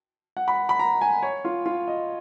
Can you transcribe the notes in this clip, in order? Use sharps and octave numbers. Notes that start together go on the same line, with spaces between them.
F#5
B5
B5
A#5
G#5
C#5
F4
F4
D#5